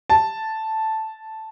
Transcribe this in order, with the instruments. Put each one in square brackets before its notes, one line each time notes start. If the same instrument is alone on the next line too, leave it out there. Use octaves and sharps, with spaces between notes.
[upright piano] A5